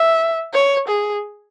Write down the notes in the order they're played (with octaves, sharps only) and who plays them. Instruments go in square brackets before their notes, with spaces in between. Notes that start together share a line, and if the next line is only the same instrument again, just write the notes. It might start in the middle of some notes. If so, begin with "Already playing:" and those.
Already playing: [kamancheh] E5
C#5
G#4